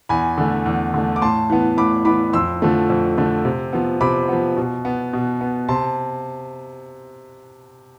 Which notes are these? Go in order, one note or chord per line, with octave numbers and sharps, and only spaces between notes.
E2 G#5 B5
D3 A3
E2
D3 A3
D6
A2 A5 C6
E3 B3
A2 B5 D6
E3 B3 B5 D6
F2 C6 E6
D3 F3 A3
F2
D3 F3 A3
C3
F3 B3
C3 B5 D6
F3 B3
B2
B3
B2
B3
C3 A5 C6